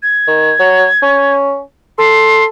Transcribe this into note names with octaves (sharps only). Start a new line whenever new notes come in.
G#6
D#3
F#3
C#4
A4 C6